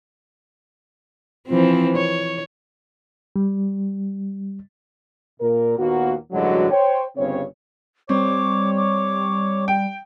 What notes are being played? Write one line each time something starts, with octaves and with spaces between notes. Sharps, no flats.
E3 F3 C4
C#5
G3
A#2 A#4
D#2 A#2 A#3 B3 F#4
A1 G2 D3 F#3 G#3 F#4
C5 C#5 G5
G1 G2 C#3 C4 C#5
G3 C4 C#5 D6
D6
G5